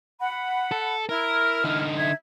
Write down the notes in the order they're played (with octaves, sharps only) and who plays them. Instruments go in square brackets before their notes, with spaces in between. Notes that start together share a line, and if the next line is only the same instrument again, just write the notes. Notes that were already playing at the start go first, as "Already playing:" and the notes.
[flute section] F#5 B5
[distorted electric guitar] A4
[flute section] E4 F6 [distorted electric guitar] A#4
[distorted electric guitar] D3 D#4
[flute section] E5 G#6